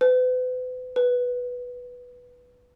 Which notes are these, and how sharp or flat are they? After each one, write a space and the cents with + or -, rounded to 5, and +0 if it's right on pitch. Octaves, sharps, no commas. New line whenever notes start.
B4 +40
B4 -5